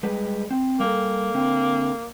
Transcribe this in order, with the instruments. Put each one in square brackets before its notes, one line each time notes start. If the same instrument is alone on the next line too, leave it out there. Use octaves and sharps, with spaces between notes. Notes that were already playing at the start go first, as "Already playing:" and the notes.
[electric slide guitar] G3 G#3 B4
C4
[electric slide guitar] G3 A4 [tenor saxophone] A#3
[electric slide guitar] D3 C4